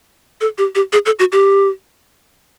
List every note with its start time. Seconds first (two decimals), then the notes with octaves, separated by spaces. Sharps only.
0.41 A4
0.58 G4
0.75 G4
0.93 G#4
1.06 A4
1.19 F#4
1.32 G4